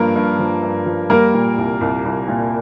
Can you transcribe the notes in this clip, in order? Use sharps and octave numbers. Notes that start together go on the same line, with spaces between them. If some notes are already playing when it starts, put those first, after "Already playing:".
Already playing: G2 F3 A#3 A#4
G2
F3
G2
F3
G3 A#3 A#4
A#2
C2
C2
C2
A#2